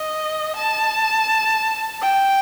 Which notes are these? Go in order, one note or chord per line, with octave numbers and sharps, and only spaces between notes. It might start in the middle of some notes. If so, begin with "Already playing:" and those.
Already playing: D#5
A5
G5